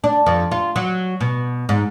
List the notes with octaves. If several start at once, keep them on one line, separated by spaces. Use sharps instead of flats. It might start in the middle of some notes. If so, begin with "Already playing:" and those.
D4
F2
F4
F#3
B2
G#2